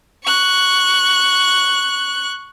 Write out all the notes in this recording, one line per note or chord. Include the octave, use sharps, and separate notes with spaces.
C#6 F#6